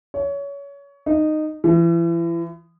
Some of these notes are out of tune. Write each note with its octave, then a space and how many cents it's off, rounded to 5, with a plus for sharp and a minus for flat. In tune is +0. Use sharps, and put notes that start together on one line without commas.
C#5 +25
D#4 -15
E3 +35